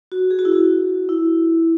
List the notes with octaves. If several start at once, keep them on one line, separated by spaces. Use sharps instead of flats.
F#4
G#4
F#4
E4
F#4
E4